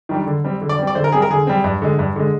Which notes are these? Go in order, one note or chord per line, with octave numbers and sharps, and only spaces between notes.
D#3 G3 D4
D3
G3 C4
D3
D5
G3 C4
D5
D3 C5
A#4
G3 C4 G#4
A#4
D3 G#4
G3 C4
G2
D3 G#3
G2
D3 G#3